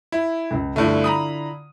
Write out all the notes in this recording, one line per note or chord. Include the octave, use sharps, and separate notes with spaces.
E4
C#2
G2 D3 A3 E4 F4
A#5 B5 D#6